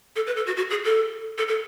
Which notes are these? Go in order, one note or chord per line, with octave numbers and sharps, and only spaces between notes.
A4
B4
A4
F#4
F#4
G#4
A4
A4
A4